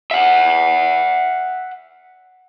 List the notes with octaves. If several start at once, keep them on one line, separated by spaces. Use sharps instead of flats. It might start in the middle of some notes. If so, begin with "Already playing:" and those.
E5 F#5